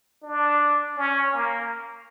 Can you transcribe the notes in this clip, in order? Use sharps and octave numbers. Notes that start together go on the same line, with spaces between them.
D4
C#4
A#3